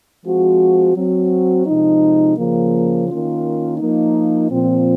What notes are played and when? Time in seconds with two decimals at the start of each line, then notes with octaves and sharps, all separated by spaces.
0.25 F3 G#3 C4 F#4
0.95 F#3 C4 F#4
1.66 C3 F3 G#3 D#4
2.37 C#3 F3 A#3
3.08 D#3 A#3 C#4 F4
3.79 F3 A#3 D#4
4.50 A#2 F3 C4